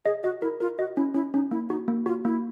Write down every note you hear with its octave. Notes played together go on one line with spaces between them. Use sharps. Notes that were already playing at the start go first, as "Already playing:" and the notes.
G#4 D#5
F#4 D#5
E4 A#4
F4 A#4
F#4 D#5
C#4 E4
C#4 E4
C#4 D#4
A#3 E4
D#4 F#4
A#3
F4 F#4
A#3 E4